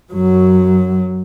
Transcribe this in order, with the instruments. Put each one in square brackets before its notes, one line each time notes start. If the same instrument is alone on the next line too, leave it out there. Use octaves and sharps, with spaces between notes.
[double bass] F#2 F#3